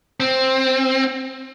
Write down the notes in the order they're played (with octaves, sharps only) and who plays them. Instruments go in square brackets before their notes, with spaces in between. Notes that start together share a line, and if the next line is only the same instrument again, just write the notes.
[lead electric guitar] C4